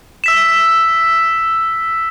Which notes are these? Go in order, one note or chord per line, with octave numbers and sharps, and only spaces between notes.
E6 B6 E7